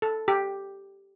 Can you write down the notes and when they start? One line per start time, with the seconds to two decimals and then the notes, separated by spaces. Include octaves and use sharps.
0.02 A4
0.28 G4